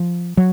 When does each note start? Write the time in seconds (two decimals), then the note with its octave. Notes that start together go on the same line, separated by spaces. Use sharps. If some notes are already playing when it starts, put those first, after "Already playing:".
Already playing: F3
0.37 F#3